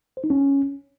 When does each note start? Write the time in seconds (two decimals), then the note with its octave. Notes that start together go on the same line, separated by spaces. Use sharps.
0.17 C5
0.24 D#4
0.30 C#4